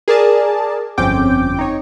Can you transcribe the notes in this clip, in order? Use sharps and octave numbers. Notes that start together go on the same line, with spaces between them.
G#4 A#4 D5 A5
G1 F2 C4 C#4 G5 D6
D#4 C#5